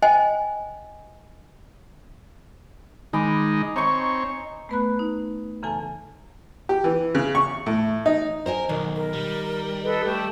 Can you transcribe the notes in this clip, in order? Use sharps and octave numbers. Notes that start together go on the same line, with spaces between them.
C5 D#5 G5 G#5
D#3 G#3 D#4 G#5 B5 D6
C4 D#4 C#5 C#6
A3 B3 B4 A#5 B5 F#6
D#4
F#2 C#3 E3 A4 G#5 A5
G4
E3
C#3
C#6
A2
D#4
A#4 C5 D#5 G#5
B1 D#3
A#4
G3
A4 B4 D#5
A3 G4 A5